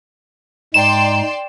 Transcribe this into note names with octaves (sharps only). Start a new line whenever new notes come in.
G#2 G#3 D5 G5 A#5 C6 E7